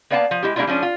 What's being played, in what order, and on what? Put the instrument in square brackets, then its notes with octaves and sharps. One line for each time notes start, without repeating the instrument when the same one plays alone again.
[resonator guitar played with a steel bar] A#3 B3 D5 F5 G5 A5
F3
G#3 E4 G4
G3 G#3 A#3 D4 E4 F4
F3 G#3 C#4 D4
F4